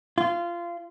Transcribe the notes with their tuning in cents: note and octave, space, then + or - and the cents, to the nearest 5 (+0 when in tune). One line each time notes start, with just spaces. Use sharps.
F4 -20